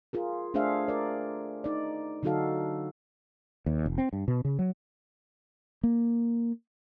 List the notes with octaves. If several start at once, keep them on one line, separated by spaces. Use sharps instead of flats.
F4 G#4 A#4
A3 D4 G#4 C5 E5 F5
A#4 D5
D#4 D5
D3 F#3 D#4 F#4 A4 F5
D#2
F1
C4
G2
B2
C#3
F#3
A#3